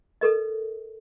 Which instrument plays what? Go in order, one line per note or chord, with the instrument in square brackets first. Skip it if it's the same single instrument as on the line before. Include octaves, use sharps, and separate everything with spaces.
[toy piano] A4 A#4 D#5